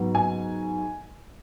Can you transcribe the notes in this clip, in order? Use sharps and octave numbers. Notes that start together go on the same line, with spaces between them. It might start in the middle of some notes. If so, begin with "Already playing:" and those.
Already playing: G#2 F#3 B3
G#5